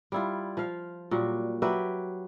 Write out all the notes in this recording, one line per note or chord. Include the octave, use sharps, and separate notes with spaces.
G3 E4 F4
F3 F5
A#2 F#3 G3 F#4
F#3 G4 B4 E5